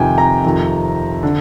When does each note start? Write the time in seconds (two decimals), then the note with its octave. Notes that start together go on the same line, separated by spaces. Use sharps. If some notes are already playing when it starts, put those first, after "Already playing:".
Already playing: F2 C3 D#3 G5 G#5
0.18 A#5
0.44 F2 C3 D#3
1.23 D3